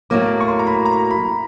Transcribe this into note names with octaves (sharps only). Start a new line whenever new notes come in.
A2 F#3 A#3 D6
C#6
C6
A#5
B5
A#5
B5